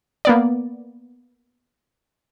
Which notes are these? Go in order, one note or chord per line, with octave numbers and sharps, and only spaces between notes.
A#3 B3 D5